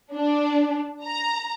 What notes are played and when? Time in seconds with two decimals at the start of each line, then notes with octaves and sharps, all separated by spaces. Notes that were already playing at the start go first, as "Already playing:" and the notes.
0.15 D4
1.04 A#5